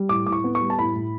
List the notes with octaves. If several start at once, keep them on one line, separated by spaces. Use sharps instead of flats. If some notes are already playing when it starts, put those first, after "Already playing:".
Already playing: G3
A2 D6
A2 D6
C#6
B3
C#6
G3
A5
A2 B5
A2